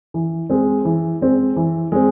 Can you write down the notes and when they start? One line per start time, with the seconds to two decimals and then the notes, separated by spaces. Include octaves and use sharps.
0.14 E3
0.50 G#3 C4
0.85 E3
1.21 G#3 C4
1.56 E3
1.92 G#3 C4